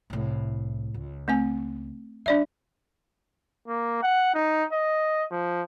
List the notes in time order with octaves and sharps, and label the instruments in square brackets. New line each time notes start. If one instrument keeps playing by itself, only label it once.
[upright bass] C2 A2
C#2
[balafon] A3 C4 G#5
[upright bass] G3 [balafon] D4 D5 E5
[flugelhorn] A#3
F#5
D#4
D#5
F3